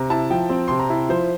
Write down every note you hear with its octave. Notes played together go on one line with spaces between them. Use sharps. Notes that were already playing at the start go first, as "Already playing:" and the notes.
Already playing: C3 A#5
E4 A5
F3 G5
C4
C3 C6
A#5
E4
F3 C5